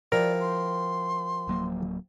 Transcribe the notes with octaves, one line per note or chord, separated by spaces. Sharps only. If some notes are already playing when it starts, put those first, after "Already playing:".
F3 E4 G4 A#4 D5
C6
D1 F#3 A#3